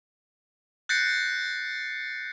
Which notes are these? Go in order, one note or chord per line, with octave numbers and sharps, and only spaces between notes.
F#6 G6 A6 A#6 C7 C#7